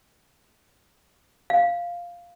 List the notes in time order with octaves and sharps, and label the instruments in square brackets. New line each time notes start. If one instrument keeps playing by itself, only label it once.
[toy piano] F5